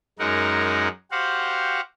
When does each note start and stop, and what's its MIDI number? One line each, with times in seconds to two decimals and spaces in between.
0.19 0.88 42
0.19 0.88 56
0.19 0.88 63
0.19 0.88 70
0.19 0.88 78
1.11 1.81 66
1.11 1.81 67
1.11 1.81 72
1.11 1.81 77
1.11 1.81 78